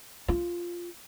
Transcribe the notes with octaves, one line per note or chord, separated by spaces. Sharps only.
F4